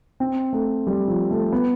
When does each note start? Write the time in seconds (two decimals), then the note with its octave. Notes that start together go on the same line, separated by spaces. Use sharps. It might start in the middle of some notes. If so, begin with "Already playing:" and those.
0.20 C4
0.53 A3
0.87 G3
1.08 F3
1.31 A3
1.52 B3